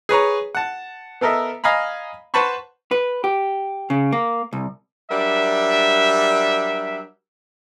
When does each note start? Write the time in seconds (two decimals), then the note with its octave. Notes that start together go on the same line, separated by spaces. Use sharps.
0.09 G#4 B4 C#5 A#5
0.55 F#5 A5
1.21 B3 A4 A#4 D#5 E5
1.64 D#5 F5 G#5 A#5 B5
2.34 B4 C5 F#5 A5 B5 C#6
2.91 B4
3.24 G4
3.90 C#3
4.13 A#3
4.53 C2
5.10 F#3 G3 D4 A#4 E5